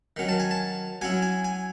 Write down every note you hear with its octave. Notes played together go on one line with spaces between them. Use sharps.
D#3 F#3 C#4
A5
G#5
A5
F#3 C#4 E4 G#5
G#5
G#5